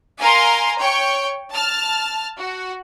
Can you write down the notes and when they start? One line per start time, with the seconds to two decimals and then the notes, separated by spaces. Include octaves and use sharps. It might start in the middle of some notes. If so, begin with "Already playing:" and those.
0.19 A#4 F5 G#5 A#5 C6
0.79 C#5 G5 C#6
1.51 A5 F6
2.38 F#4